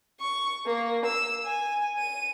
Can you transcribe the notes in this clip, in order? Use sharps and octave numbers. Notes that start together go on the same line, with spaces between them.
C#6
A#3
E6
G#5
D#7